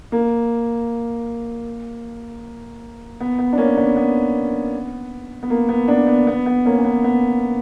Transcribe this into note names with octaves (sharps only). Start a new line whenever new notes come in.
A#3
B3
B3
D4
A#3 C#4
B3 D4
B3
B3
A#3
B3
B3 D4
B3
B3
B3
A#3 C#4
C#4
B3
B3